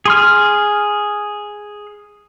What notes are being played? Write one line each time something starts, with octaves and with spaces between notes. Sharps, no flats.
G#4 C6 F6